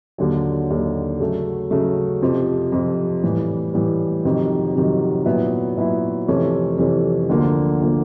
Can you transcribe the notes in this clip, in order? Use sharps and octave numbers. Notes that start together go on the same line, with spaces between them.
D#2 D3 F#3
D#2 D3 F#3
C#3 F#3 A3
C#3 F#3 A3
F2 C3 F3
F2 C3 F3
A2 E3 G3
A2 E3 G3
F2 C3 D#3 F#3
F2 C3 D#3 F#3
A#2 F#3 B3 E4
A#2 F#3 B3 E4
F2 C3 E3 A3 C#4
F2 C3 E3 A3 C#4
D2 D3 F3 A#3
D3 F3 A#3